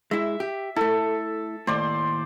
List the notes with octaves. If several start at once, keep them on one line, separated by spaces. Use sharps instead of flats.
G#3 E4 E5
G4
A3 E4 A4
D#2 A2 C5 D5